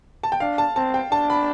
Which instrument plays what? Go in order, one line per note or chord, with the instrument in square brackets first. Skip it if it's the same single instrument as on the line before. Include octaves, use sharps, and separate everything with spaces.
[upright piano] A5
G5
[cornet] D4 [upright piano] F5
[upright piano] A5
[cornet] C4 [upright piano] A5
[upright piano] G5
[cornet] D4 [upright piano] A5
[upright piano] B5